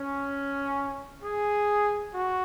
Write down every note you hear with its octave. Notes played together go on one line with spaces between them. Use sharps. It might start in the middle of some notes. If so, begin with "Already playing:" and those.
Already playing: C#4
G#4
F#4